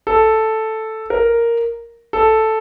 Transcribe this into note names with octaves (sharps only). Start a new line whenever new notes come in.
A4
A#4
A4